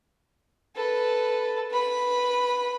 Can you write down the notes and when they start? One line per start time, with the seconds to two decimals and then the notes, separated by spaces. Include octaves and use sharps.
0.76 A4 B4
1.71 B4 B5